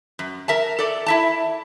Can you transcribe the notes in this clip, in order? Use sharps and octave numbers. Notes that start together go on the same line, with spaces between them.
F#2
A#4 E5 A5
A4 D5
E4 E5 A5